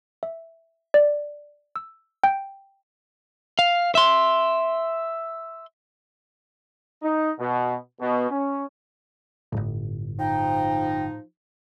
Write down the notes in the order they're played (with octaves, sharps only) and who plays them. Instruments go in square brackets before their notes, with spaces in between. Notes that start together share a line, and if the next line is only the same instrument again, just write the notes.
[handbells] E5
D5
E6
G5
[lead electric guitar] F5
E5 C6
[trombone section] D#4
B2
B2
C#4
[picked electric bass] D1 G1 [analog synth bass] A2
[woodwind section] F3 D#4 [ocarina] G5